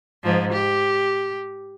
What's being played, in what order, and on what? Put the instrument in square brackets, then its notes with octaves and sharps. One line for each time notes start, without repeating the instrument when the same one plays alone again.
[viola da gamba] G#2 F3
G4